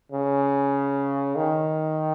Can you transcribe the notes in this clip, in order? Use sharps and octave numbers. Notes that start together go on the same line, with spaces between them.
C#3
D#3